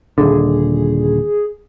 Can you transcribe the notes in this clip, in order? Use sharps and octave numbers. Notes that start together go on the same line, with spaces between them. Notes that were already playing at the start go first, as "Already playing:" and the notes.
D#1 G#1 D3 G#4